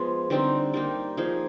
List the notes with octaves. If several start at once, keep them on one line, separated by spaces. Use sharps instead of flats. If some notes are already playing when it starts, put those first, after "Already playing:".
Already playing: F3 G#3 B3
D3 G3 C4 D#4
G3 A#3 D#4
F3 A#3 D#4 G#4